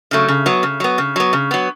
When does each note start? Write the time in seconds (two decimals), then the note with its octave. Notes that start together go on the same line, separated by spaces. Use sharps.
0.11 C#3 F#3 A3
0.28 C#3
0.46 F#3 B3
0.63 C#3
0.80 F#3 B3
0.98 C#3
1.16 F#3 B3
1.33 C#3
1.51 F#3 B3